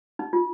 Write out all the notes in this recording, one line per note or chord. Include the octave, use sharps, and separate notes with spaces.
D#4
F4